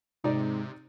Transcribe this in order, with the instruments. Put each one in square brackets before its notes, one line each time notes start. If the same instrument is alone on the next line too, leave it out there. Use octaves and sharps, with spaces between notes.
[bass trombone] G#2 [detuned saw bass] C3 [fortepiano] D#4 D5